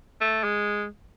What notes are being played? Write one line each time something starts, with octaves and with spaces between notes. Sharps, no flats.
A3
G#3